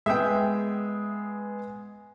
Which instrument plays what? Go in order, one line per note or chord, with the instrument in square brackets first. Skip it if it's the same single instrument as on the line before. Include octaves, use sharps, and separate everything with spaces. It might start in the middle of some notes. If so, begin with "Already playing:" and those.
[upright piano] G#3 B3 G#4 [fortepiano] E5 G5